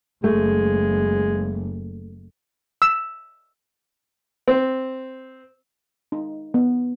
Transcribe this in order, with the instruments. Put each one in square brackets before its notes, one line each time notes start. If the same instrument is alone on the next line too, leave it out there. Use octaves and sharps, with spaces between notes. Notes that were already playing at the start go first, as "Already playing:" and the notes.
[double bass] F#1 [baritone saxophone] G#3 [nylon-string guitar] A3
[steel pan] E6
[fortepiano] C4
[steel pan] D#4
B3